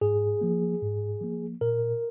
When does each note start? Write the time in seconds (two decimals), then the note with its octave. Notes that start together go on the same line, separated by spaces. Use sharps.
0.01 G#2 G#4
0.41 F3 A#3
0.82 G#2
1.21 F3 A#3
1.61 A#2 A#4